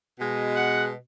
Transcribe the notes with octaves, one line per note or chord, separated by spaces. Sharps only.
B2 G#3
F#5